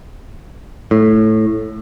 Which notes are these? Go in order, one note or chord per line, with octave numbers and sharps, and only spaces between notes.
A2